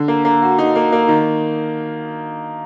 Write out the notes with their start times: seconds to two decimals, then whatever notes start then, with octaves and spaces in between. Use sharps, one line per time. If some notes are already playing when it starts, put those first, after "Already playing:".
Already playing: D3
0.08 A#3
0.25 A#3
0.42 F#4
0.58 D#4
0.76 A#3
0.92 A#3
1.08 D#3